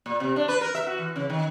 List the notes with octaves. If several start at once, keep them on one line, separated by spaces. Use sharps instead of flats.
A#2
C3
D4
B4
A#4
E5
F#4
E3
C#3
D#3